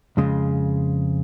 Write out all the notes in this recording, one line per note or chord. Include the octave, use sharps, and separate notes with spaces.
F2 C#3 G#3